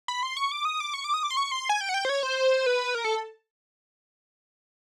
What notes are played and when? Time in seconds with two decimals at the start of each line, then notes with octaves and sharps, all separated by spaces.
0.08 B5
0.23 C6
0.37 C#6
0.52 D6
0.65 D#6
0.80 D6
0.94 C#6
1.04 D6
1.14 D#6
1.23 D6
1.30 C6
1.37 C#6
1.52 C6
1.69 G#5
1.81 G5
1.89 F#5
1.94 G5
2.05 C5
2.09 C#5
2.23 C5
2.66 B4
2.95 A#4
3.04 A4